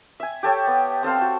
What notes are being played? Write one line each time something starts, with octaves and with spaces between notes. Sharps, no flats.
E5 G#5
G4 A4 C#5 G5
B3
C4 A4 C5 F5
F#4 A5